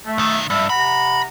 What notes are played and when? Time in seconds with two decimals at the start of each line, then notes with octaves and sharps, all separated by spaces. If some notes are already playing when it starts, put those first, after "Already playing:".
0.06 A3
0.18 B1 D#3
0.50 G2 E5
0.69 C3 F#5 A#5 B5